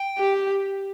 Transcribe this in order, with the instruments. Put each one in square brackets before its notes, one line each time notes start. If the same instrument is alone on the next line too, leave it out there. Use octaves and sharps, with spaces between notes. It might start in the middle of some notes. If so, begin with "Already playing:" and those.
Already playing: [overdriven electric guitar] G5
[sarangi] G4